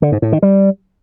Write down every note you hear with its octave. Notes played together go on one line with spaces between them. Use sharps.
D3
G#2
A2
D#3
G3